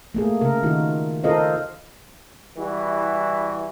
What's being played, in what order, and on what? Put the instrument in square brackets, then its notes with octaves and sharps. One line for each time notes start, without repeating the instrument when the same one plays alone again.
[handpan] A3 A#3 G#4
C#3 A#4
D#3 D#4 F4 F#4
F4 A4 A#4 C5 D#5 F5
[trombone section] E3 G3 E4 F#4